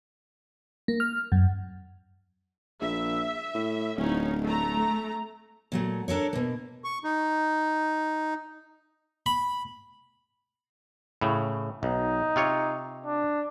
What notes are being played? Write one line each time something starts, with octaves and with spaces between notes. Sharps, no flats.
A#3
F6
F#2
A#1 E5
A2
D1 C#4 D#4
A3 A#5
A#2 F#3 A3
D4 A4 A#4 C#5
B2 A#3
C#6
D#4
B5
A2 C#3
B1 D#4
C3 F4 C#5
D4